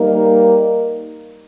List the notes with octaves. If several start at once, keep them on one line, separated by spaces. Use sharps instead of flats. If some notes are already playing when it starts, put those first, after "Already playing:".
Already playing: G3 A#3 D#4 A#4